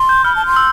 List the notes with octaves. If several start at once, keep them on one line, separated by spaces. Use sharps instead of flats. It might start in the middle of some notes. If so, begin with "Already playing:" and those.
Already playing: C6
G6
B5 F6
A5
C6 F6
E6